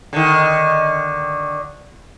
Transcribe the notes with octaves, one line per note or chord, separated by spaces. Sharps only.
D3 D#3